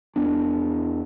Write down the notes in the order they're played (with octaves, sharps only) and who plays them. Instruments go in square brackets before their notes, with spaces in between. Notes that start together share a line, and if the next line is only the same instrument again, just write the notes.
[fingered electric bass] E2 B3 D4